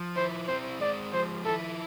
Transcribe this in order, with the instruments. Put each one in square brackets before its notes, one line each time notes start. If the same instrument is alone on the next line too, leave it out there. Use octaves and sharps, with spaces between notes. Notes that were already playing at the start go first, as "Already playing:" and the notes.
Already playing: [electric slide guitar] F3
[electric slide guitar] E4 [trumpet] C5
[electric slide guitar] C4 [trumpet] C5
[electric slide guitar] G#3 [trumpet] D5
[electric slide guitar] F3 [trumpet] C5
[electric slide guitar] E4 [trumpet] A4